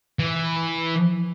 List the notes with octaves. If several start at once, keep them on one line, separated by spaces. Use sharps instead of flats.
E3